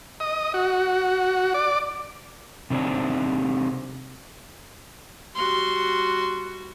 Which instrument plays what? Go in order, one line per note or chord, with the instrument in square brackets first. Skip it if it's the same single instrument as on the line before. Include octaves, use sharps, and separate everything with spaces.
[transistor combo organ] D#5
F#4
D5
[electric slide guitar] C3 D#3 C4 D4
[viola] G3 F#4 [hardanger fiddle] C6